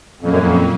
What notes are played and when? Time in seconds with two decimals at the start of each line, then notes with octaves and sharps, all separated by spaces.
0.20 F2 A#2 F#3 A#3 C#4
0.30 F#2
0.39 F2